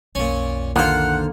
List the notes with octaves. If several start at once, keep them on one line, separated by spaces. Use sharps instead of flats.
B1 F2 A#2 C#4
D3 D#3 A#3 F4 C5 F#5